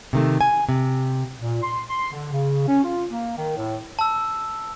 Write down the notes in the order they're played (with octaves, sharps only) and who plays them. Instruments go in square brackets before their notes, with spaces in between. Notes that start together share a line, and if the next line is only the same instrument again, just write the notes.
[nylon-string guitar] C3 D#3 A3
G#5
C3
[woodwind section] A#2
C6
C6
D3
C#3
C#4
F4
A#3
D#3
A2
[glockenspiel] A5 E6